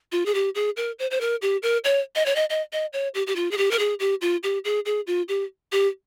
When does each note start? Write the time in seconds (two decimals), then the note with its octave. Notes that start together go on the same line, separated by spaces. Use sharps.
0.12 F4
0.26 G#4
0.34 G4
0.55 G#4
0.77 A#4
0.99 C5
1.11 C5
1.21 A#4
1.42 G4
1.63 A#4
1.84 C#5
2.15 D#5
2.26 C#5
2.36 D#5
2.50 D#5
2.73 D#5
2.93 C#5
3.15 G4
3.27 G4
3.36 F4
3.51 G#4
3.57 G4
3.71 A#4
3.79 G#4
4.00 G4
4.21 F4
4.43 G4
4.65 G#4
4.86 G#4
5.07 F4
5.29 G4
5.72 G4